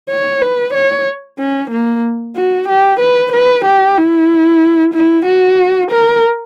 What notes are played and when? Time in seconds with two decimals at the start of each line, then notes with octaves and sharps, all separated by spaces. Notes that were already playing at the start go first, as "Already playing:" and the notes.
0.10 C#5
0.42 B4
0.74 C#5
1.39 C#4
1.71 A#3
2.36 F#4
2.69 G4
3.00 B4
3.32 B4
3.65 G4
3.98 E4
4.94 E4
5.26 F#4
5.91 A#4